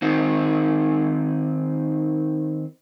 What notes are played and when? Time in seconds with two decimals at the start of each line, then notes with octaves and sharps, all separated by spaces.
0.02 D#3 C4 D#4